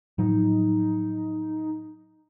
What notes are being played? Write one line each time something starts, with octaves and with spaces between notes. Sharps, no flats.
A2 F3 F#3 D#4